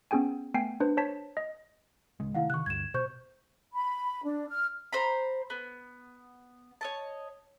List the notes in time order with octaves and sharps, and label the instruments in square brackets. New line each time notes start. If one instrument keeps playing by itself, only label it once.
[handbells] B3 C#4 G#4 G5 G#5
A3 B3 G5 G#5 C7
D4 B4 C5
C5 C#5 A5 B6
D#5
[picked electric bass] D1 C#3 G#3
[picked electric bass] C3 D#3 A3 [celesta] E4 F5 F#5
[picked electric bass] C3 D#3 [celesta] C#6 F#6
[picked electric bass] D2 G2 [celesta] G#6 E7
[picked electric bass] B2 [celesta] C5 C#6 G6
[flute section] B5
D4
F6
[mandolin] C5 A#5 B5
B3
C#5 D#5 A5